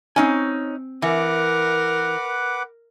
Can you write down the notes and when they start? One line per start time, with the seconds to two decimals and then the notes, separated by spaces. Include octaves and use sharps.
0.16 C4 C#4 D#4 G#5
1.02 E3 A#4 B4 F#5 D6